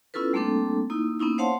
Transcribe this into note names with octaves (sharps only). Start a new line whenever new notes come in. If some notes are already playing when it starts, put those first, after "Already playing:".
B3 C#4 E4 F4 A4 B4
G3 A3 A#3 C4 D4 A4
A#3 D#4 E4
A#3 B3 C#4 D#4 E4
C5 C#5 F5 F#5 A5 C6